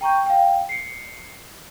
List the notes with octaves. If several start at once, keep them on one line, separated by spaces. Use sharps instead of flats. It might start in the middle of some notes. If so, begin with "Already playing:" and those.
G5 A#5 C#6 G6
F5 G5
C7 C#7